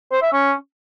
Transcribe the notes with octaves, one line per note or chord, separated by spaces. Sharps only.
C5
E5
C#4